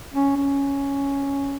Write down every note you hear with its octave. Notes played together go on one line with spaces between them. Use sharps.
C#4
C#4